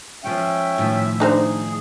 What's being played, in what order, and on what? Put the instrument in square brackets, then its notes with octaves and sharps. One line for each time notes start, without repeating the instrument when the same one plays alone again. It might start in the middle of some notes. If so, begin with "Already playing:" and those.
[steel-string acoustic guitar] F3 G#3 [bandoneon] C#4 G5 [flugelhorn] E5
[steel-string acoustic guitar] A2 D#3 F3
[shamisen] D4 D#4 C5 [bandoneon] G#4